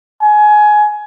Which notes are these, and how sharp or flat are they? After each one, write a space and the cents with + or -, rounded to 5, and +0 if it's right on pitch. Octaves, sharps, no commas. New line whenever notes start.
G#5 +20